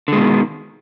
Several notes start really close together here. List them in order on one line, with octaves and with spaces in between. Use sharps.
D3 G#3 B2 D#3